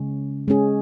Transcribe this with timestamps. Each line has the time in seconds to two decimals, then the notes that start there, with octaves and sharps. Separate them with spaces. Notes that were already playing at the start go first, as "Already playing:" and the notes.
Already playing: C#3 G#3 C#4
0.48 G#3 C#4 G#4